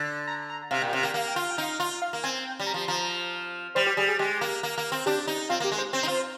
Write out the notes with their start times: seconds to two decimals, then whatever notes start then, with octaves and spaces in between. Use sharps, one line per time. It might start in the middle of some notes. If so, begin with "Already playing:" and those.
Already playing: D3
0.27 A#5
0.50 A#5
0.71 C3 F5
0.82 A#2 G5
0.93 C3 F5
1.03 A#3 G5
1.14 A#3 F5
1.28 G5
1.36 F4 F5
1.51 G5
1.58 D#4 F5
1.80 F4
2.02 F5
2.13 A#3
2.23 C4 G#5
2.45 G5
2.60 G3
2.67 A#5
2.74 F3
2.82 C6
2.88 F3 A#5
3.75 G3 C5
3.87 G4
3.97 G3 G#4
4.08 G#4
4.19 G#3 G4
4.41 A#3
4.63 A#3
4.78 A#3
4.92 C4
5.06 D4 G4
5.28 D#4
5.49 C4 F4
5.60 A#3 G4
5.72 G#3
5.78 C5
5.93 C4 C5
6.03 D#4
6.08 F4